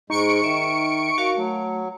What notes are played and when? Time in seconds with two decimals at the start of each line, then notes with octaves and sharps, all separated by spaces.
0.10 G#2 G#3 D#4 C#6 C#7 D7
0.44 D#3 E5
1.18 F#4 A#4 F5
1.37 F#3 A3